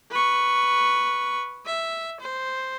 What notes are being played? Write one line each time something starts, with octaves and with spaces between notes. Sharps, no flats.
B4 C#6
E5
C5